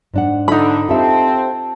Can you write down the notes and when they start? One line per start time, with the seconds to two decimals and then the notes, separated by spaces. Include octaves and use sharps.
0.14 G#2 D4 F#5
0.48 D3 D#4 B5
0.89 C4 F4 G4 A4 E5